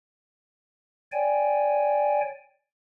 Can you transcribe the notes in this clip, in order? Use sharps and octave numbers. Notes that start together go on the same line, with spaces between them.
C#5 D5 G5 G#5